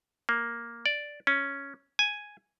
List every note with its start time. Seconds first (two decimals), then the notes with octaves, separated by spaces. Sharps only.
0.29 A#3
0.86 D5
1.27 C#4
1.99 G#5